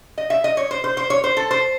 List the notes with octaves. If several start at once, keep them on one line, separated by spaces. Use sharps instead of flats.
D#5
E5
D#5
C#5
C5
C5
C5
C#5
C5
A4
C5